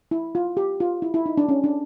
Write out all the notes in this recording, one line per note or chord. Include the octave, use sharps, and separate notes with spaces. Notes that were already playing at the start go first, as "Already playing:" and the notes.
E4
F4
G4
F4
E4
E4
D#4
D4
C#4
D4